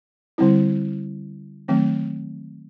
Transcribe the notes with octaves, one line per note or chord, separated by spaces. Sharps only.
D3 G3 C4 E4
D#3 F#3 A3 C4